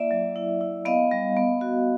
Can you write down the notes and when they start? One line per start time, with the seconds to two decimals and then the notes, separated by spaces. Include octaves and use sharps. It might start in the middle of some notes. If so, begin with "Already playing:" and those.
Already playing: A#3 E4 D5 E5
0.11 F#3
0.36 E4
0.61 E4
0.85 B3 D#5 F5
1.11 G3
1.37 B3
1.61 F#4